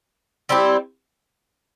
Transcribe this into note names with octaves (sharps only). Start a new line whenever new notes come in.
G3 C4 E4 G4